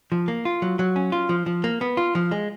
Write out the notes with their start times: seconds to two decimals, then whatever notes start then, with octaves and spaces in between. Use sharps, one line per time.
0.12 F3
0.28 A#3
0.45 F4
0.62 F#3
0.79 F#3
0.96 C#4
1.12 F4
1.29 F3
1.46 F3
1.64 A#3
1.81 B3
1.97 F4
2.15 F3
2.31 G#3